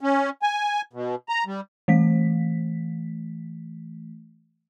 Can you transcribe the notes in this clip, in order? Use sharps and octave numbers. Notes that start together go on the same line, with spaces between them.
C#4
G#5
B2
A#5
G3
E3 A3 B6